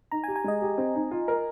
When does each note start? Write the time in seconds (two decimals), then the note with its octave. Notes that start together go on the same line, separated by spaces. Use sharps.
0.12 D#4 A#5
0.24 G#5
0.28 G4
0.36 G#5
0.44 G#3 D#5
0.62 G4
0.78 C4
0.95 D#4
1.11 F4
1.28 A#4